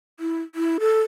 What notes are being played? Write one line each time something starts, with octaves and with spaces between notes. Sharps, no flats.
E4
E4
A4